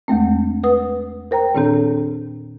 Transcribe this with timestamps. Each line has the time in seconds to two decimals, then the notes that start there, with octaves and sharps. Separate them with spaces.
0.08 E2 G#3 A3 C4
0.64 B4 F#5 D#6
1.31 A#4 C5 G5 A#5
1.55 A#2 D#3 C4 D4 A4